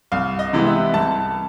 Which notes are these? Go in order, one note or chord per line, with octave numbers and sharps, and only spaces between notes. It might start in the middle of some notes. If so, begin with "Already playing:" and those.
C2 F5
D#5
C3 E3 G#3 B3
E5
C2 A5